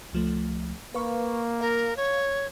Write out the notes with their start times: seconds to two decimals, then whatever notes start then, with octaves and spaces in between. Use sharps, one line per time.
0.13 C#2 F3 A3
0.94 A#3 B4 F5 C#6
1.61 A#4 F5
1.97 C#5